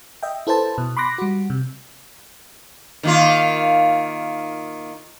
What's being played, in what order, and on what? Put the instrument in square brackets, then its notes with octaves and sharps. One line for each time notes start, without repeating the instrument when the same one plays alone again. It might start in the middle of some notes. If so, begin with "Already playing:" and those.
[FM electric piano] D#5 E5 G5
E4 A4 B4 C5 A5
B2
B5 C6 D6 F#6 A#6
G3 F#4
C3
[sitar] D#3 A#3 F4